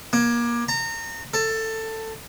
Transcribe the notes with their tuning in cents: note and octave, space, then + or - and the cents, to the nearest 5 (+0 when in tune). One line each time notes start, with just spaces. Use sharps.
A#3 +30
A#5 -30
A4 +15